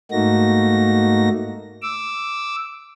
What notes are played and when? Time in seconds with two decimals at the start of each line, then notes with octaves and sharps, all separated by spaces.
0.11 G#2 A3 A#3 D#4 F#4 A#6
1.82 D6 E6